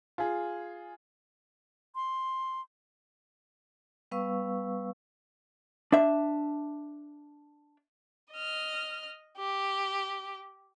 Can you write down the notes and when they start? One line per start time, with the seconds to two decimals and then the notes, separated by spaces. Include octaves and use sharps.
0.18 F4 G#4
1.95 C6
4.11 G3 B3 B4 F5 C#6 E6
5.92 D4 E5
8.32 D#5 F6
9.38 G4